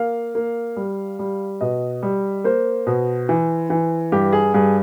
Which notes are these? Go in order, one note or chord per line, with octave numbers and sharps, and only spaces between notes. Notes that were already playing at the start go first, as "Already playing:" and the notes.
Already playing: A#3 F5
A#3
G3
G3
B2 D#5
G3
A#3 C5
B2
E3
E3
G2 G4
G#4
G2 G#4